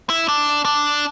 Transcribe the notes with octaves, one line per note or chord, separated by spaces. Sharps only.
E4
D4
D4